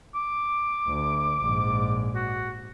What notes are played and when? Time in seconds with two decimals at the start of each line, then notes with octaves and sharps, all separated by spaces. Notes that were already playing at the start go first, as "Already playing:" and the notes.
0.15 D6
0.88 D2
1.40 A#1 G#2
2.15 F#4